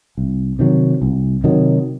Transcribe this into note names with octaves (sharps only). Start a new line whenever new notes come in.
C2
C3 D#3 F#3
C2
C3 D#3 F#3